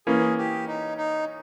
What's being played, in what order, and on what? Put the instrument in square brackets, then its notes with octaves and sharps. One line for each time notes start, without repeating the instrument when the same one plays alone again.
[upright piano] E3 A#3 C#4 [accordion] G#4
[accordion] G4
D#4
D#4